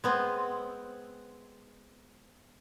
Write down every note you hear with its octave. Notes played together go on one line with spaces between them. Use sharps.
G#3 B3 C4